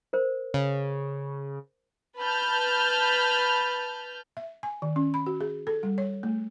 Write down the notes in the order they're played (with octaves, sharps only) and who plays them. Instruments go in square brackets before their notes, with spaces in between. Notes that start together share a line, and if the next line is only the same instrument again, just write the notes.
[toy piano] A#4 C5
[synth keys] C#3
[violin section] B4 A5 B5 F6 G6
[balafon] E5
G#5
D#3
C#4
B5
F#4
G#4
A4
G3
C#5
A3